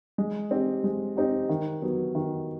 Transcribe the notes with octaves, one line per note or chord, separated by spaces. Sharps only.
G#3
C4 D#4 G4
G#3
C4 D#4 G4
D#3
F#3 B3
D#3